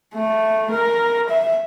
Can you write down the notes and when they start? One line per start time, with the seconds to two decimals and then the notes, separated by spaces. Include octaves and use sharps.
0.15 A3
0.71 A#4
1.30 E5